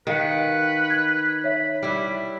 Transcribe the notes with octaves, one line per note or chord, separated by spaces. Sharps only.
D#3 G4 B4 F5 C#7
G#6
C#5 E5 B5
G3 E4